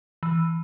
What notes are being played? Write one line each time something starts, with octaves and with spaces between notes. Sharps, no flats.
E3